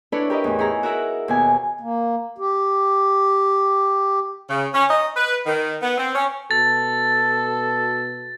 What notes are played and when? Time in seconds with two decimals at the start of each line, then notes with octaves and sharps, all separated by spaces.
0.12 D4 E4 A4 B4 C#5 D5
0.30 G4 A#4 B4 D#5
0.44 E2 A2
0.59 D#4 E4 G#4 A#5
0.83 F#4 A#4 E5 F#5
1.28 D#2 B2 G#5
1.81 A#3
2.38 G4
4.50 C#3
4.74 C#4
4.90 D#5
5.16 B4
5.46 D#3
5.82 B3
5.98 C4
6.15 C#4
6.51 B2 A4 A6